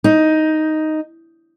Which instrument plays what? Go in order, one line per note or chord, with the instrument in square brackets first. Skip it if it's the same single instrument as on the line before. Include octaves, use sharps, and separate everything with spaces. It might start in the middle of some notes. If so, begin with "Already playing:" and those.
[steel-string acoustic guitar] D#4